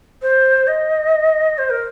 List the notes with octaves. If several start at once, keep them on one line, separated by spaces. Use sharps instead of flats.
C5
D#5
C5
A#4